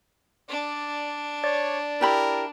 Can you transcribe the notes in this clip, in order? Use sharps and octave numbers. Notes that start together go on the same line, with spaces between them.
D4 D5
C#5 D5
E4 G4 A#4 B5